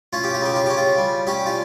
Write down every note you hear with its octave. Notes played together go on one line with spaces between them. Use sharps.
C#4 F4
G4
F4
C#3 G4
F4
C#4 G4
F4
G3
C#4 G4
F4